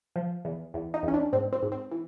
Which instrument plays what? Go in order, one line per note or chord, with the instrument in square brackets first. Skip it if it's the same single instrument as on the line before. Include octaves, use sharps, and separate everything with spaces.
[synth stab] F3
E2
E2
D#4
E2 C#4
D4
G#2 C4
C4
G#2
C4
E3